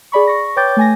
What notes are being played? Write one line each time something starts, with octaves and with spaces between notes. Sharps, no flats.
G#4 D5 B5 C#6
C#6 A#6
B4 C#5 G5 D6 G6 A6
A3 G#5 A#6